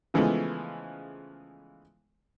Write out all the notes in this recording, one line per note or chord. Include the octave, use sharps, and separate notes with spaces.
C#3 E3 F3 G#3 A3 B3